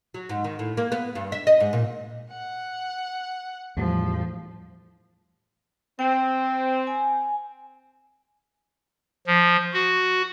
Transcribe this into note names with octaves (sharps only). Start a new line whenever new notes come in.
F#3
G#2
D#3
A2
A#3
B3
G2
E5
D#5
G#2
A#2
F#5
E2 A2 F3 G3
C4 G5
G#5
F3
F#4